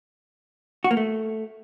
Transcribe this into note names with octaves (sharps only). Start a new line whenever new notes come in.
F#4
A#3
A3